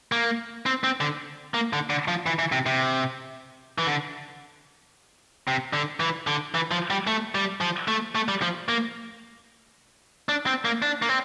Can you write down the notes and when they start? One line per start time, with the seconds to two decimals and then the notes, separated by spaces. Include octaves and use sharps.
0.12 A#3
0.66 C4
0.84 C4
1.01 D3
1.54 A#3
1.73 D3
1.90 D3
2.08 F3
2.26 E3
2.39 E3
2.52 C3
2.66 C3
3.78 E3
3.87 D3
5.48 C3
5.73 D3
6.00 E3
6.27 D3
6.55 E3
6.71 F3
6.90 G3
7.07 A3
7.35 G3
7.61 F3
7.88 A3
8.15 A3
8.28 G3
8.42 F3
8.69 A#3
10.29 D4
10.46 C4
10.65 A#3
10.82 D4
11.02 A#3
11.09 C4